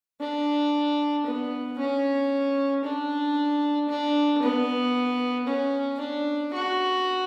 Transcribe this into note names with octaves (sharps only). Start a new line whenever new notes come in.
D4
B3
C#4
D4
D4
B3
C#4
D4
F#4